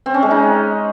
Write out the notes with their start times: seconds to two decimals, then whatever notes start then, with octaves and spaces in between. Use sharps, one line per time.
0.06 C4
0.14 C#4
0.23 G#3
0.31 D#4